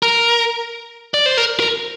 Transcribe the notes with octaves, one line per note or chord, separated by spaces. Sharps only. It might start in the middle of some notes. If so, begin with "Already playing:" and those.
A#4
D5
C5
A#4
A#4